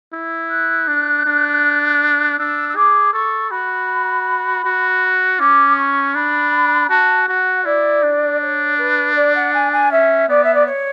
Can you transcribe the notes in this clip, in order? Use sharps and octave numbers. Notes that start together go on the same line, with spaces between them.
E4
F#6
D4
D4
D4 E6
E6
G#4 D6
A4 C#6
F#4 B5
F#4
C#4 D6
C#6
D4 B5
F#4 A5
F#4 F#5
E4 D5
D4
C#5
B4
D5
F#5
G#5
G#5
C#4 E5
B3 D5
E5
D5
C#5